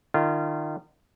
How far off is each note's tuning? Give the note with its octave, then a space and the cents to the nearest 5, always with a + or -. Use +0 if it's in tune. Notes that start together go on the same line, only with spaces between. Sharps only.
D#3 -30 F4 -30